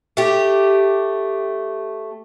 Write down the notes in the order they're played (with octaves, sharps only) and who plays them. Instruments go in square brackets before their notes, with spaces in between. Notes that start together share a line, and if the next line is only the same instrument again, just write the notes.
[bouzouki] A3 G4